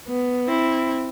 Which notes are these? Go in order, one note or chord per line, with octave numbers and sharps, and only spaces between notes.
B3
C4 E4